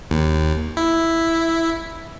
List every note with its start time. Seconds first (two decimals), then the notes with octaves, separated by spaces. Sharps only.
0.11 D#2
0.77 E4